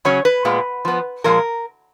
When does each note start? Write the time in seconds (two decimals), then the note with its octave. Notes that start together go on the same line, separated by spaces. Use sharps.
0.05 C#3 F#3 C#4 C#5
0.25 B4
0.45 A#2 G#3 B3
0.85 F3 B3
1.24 A#2 F3 G#3 A#4